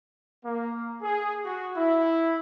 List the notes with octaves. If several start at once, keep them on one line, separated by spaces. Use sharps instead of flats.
A#3
G#4
F#4
E4